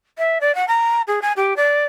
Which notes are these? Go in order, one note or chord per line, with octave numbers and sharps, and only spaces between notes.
E5
D5
F#5
A#5
G#4
G#5
G4
D5